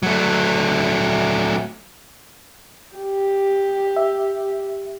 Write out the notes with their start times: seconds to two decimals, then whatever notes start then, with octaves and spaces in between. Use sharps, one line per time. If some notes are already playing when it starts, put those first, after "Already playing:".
0.03 F#3 A3
2.96 G4
3.97 E5